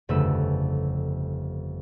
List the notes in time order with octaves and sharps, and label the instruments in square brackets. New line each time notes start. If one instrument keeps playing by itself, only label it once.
[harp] G1 F2 C#3 A3 B4 E6